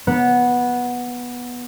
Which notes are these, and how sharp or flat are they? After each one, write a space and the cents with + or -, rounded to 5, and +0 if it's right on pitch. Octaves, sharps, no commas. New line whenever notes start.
B3 -10